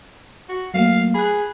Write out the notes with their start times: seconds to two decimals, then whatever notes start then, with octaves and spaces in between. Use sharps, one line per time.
0.49 F#4
0.74 F#3 A3 A#3 F5
1.14 G#4 B5 F#6